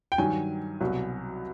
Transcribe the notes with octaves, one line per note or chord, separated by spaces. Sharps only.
G5
G2 D#3 F#3 G#5
C2 B2 F#3